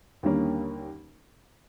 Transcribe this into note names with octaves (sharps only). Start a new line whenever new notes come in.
D#2 D3 G3 A#3 C#4